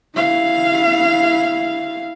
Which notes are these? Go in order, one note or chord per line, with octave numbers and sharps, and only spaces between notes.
E4 F5